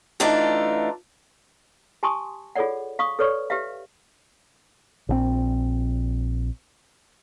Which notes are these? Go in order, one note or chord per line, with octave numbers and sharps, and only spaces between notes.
E3 A3 D4 D#4 F4
G4 G#5 A5 C6 C#6 D#6
F4 G#4 A4 C#5 D5 F#5
F5 C#6 D#6
A4 B4 C#5 D5 C#6
G4 B4 E5 F5
A#1 E3 C4